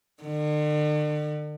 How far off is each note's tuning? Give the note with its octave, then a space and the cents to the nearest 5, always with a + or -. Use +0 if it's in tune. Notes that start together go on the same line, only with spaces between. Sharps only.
D3 +45